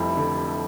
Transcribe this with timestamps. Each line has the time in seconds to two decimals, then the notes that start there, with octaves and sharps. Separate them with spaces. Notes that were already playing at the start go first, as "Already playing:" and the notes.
Already playing: F1 F2 G3 E4
0.17 D3